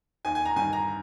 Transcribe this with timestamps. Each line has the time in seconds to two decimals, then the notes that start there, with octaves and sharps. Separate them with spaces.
0.25 D#2 D#3 G#5
0.35 G#5
0.45 A#5
0.56 G2 D#3 G#5
0.73 A#5